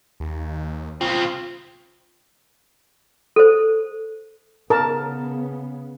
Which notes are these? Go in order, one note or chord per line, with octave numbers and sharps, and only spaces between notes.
D#2
C#3 C4 F4
A4 C5
C#3 B3 A#4 A5